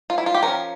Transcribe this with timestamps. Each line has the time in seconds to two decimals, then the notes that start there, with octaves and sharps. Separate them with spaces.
0.10 F4
0.18 E4
0.26 F4
0.34 G4
0.42 F3 C#4 A#4